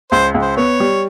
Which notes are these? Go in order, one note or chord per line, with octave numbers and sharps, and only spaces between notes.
C#2 C5
C#2
C5
B3 C#5
G3